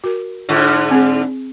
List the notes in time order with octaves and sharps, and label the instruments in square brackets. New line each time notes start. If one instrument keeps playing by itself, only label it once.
[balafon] F#4 A#4
[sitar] G#2 D3 [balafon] F4
[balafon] C4 G#4